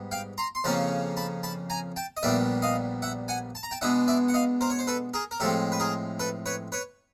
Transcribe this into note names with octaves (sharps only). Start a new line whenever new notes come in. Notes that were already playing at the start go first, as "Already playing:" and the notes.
Already playing: G#2 G3 B3
F5 G5
A#5 C6
C6
F2 C#3 F3 A#3 C#4 A5 B5
A5 B5
A5 B5
G#5 A#5
G5 A5
D#5
A#1 A#2 G3 B3 D4 D5 E5
D#5 F5
E5 F#5
F#5 G#5
A5
A#5
G5 A5
B2 G#3 B3 D4 E5 F#5
D5 E5
F#5
D#5 F5
A#4 C5
C#5
C5
A4 B4
G#4 A#4
A#4
A2 F3 G#3 C4 G4 A4
B4
G#4 A#4
A4 B4
B4 C#5
B4 C#5